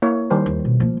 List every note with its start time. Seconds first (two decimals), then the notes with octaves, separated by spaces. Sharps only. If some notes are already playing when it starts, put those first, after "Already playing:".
0.02 A#3 E4 C#5
0.30 D#3 G3 C5
0.46 D#2
0.65 B2
0.80 F3 A#3